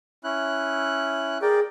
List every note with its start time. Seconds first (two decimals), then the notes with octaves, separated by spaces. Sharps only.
0.24 C#4 E4 F#6
1.42 G#4 A#4 D5 G5